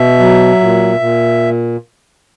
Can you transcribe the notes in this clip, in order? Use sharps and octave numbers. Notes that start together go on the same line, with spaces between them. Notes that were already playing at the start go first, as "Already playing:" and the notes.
Already playing: B2 E5
F#3
A#2
A#2